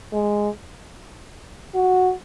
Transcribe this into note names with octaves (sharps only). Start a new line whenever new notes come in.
G#3
F#4